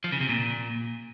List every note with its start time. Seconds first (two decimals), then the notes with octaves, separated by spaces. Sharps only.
0.04 F3
0.12 C#3
0.21 C3
0.29 A#2